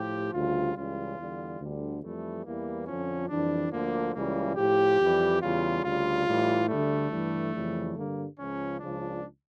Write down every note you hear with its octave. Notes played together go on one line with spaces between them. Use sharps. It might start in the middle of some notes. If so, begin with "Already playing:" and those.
Already playing: A2 F3 G4
D2 C#3 G3 F4
C#2 C#3 E3 G3 F4
E2 D3 G3
D2 D3 G3
F2 E3 G3 A3
E2 E3 G3 A#3
F2 D3 F3 C#4
F2 E3 G3 D4
D2 D3 F3 A#3
C#2 C#3 E3 G3 A#3
A2 F3 G4
F2 E3 G3
E2 C#3 G3 F4
D2 C#3 G3 F4
A2 E3 G3
D2 D3 G3 A3
G2 E3 G3
F2 C#3 E3 G3
G2 D3 G3 A#3
C#2 C#3 F3 C#4
C#2 C#3 F3 D4